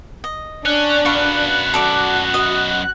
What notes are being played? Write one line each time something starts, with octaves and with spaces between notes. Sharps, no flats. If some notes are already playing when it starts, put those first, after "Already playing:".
D#5
C#4 D4 D5 F#6
F#2 B3 B4 F5 C#6
F#4 A4 D5 D6
D#5